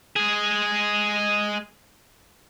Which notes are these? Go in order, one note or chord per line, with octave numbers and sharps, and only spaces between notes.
G#3 G#4